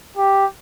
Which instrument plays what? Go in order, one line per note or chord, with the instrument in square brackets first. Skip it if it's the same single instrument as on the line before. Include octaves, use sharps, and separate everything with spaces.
[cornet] G4